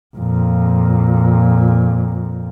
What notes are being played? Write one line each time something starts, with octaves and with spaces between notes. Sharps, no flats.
F2 A#2